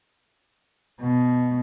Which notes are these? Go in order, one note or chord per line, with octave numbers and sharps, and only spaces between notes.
B2